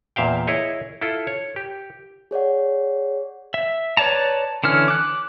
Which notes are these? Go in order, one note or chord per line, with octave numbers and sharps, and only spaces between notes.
E2 A#2 E5 F5 G5
E4 G#4 C#5 D#5
E4 F4 A4
C#5
G4
G#4 C#5 D5 F#5
E5
B4 C#5 D5 A5 A#5
D3 E3 C#4 F6
D6 F#6